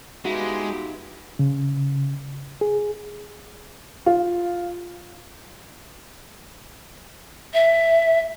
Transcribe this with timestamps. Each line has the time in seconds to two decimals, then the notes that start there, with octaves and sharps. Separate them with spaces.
0.25 G#3 B3 D#4 F#4 G4 E5 F5
1.39 C#3
2.61 G#4
4.06 F4
7.54 E5